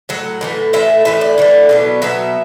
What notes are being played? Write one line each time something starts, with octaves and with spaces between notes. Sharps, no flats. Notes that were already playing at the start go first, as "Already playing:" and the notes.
A2 F#3 F#5
A2 E3 A3
A2 E3 A3 E5
A2 E3 A3 E5
D5
A2 E3 A3
B2 F#3 B3
B2 F#3 B3 E5